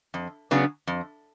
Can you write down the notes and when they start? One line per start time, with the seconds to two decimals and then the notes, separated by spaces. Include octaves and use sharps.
0.14 F2
0.51 C#3 F#3 B3 D4
0.87 F2